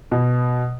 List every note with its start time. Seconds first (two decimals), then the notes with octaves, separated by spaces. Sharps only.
0.12 B2